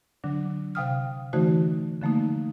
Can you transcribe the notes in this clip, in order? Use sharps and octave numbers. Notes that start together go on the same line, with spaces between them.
D3 F#3 D4
C3 F5 G5 D#6 F6
D3 E3 A3 D#4 F#4 C5
D3 F3 A3 A#3 D#4